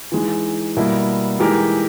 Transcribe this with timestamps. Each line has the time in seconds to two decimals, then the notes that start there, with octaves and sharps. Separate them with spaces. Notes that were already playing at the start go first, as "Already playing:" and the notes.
0.12 E3 G#3 D#4
0.77 B2 G3 A#3 E4
1.40 E3 G#3 D#4 G4 A#4